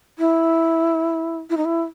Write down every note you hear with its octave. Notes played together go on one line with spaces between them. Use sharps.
E4
E4
D#4
E4